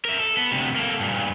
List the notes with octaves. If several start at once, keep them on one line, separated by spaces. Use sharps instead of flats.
A#4 E5
A4
B3
D2 C3
A#3 A4
G2 A#2